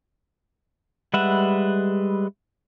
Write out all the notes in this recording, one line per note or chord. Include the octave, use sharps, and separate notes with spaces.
G3 G#3 B4 E5 F#5